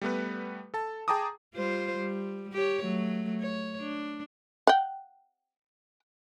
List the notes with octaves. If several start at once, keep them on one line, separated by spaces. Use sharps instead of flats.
G3 A3 B3 B4
A4 A5
G#4 G5 A5 A#5 D6 D#6
G3 F4 C5
G3
G4 C#5
F#3 A3
C#5
D4
F#5 G5